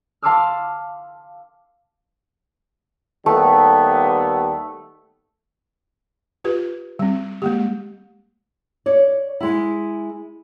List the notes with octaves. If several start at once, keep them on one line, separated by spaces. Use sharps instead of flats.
F5 A5 C6 D6 E6 F6
D#2 G3 A3 B3
F4 G4 B4
G3 C4
G#3 A#3 G4
C#5 D5
G#3 E4